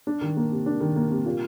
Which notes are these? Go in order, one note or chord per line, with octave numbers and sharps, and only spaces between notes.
D4
D#3
A#3
C3
D4
D#3
A#3
C3
A#2